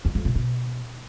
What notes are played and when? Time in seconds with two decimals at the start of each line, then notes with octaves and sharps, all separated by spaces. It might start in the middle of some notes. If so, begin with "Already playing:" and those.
0.05 E2
0.15 F2
0.25 B2
0.35 B2